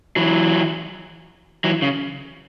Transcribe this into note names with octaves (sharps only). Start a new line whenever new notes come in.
E3 F#3
E3 F#3
C#3